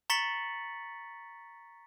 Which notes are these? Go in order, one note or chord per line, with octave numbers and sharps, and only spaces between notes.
A#5 C#6 A6 B6 C#7 F#7